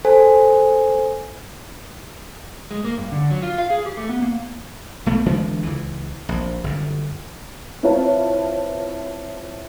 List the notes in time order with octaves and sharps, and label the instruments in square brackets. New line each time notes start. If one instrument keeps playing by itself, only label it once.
[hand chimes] A4 C5 G#5
[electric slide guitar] G#3
A#3
G2
D3
F#3
F4
F5
G#4
G4
A3
B3
A#3
[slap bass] B1 A3 B3
G1 E3 G#3 D4
C#2 E3
A#1
G1 F#2
[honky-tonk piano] C4 E4 F4 B4 C#5 A5